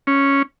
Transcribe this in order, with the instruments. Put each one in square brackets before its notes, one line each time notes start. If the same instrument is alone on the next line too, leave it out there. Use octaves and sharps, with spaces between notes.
[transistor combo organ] C#4